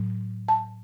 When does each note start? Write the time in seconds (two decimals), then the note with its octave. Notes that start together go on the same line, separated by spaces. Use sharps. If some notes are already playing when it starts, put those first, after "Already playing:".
Already playing: A2 F#3
0.49 A5